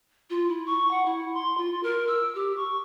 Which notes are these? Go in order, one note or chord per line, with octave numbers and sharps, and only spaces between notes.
F4
E4
C#6
F#5
E4
C6
F4
A#4
E6
G4
C#6